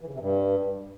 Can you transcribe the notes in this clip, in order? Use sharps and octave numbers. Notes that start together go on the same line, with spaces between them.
E3
C#3
C3
G2